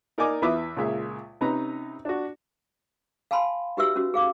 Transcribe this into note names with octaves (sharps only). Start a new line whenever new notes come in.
D#4 A#4 D5 D#5 G#5 D6
E2 E4 B4 E5 D6 D#6
C#2 A#2 G#3 E5
C3 C#4 D#4 B4 A#5
D4 F#4
F5 G#5 A5 B5 C6
D#4 F#4 G4 B4 E5 E6
C#4 F#4
G#4 F5 D6